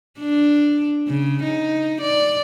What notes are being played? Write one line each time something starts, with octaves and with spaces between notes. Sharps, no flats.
D4
C#3
D#4
D5